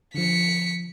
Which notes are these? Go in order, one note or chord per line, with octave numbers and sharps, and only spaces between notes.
D3 F3 B6 C#7